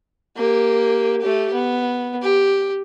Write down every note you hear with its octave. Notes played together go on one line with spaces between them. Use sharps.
A#3 G4
A3 G4
B3
G4